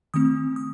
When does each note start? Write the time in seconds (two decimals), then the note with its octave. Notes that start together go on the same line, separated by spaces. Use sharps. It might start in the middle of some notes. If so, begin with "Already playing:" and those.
0.14 D#3 A3 C4 D#6
0.56 D#6